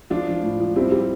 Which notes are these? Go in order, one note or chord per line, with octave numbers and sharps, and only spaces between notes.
F3 D4 F4
F3
A2
F3
G3 C4 E4
G3